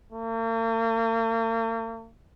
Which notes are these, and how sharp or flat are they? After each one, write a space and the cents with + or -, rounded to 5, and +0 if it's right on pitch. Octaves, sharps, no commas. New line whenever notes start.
A#3 -45